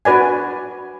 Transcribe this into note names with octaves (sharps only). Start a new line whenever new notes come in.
D4 F#4 B4 D5 G#5